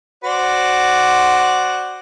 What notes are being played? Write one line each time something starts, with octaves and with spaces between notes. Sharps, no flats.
F#4 C5 D5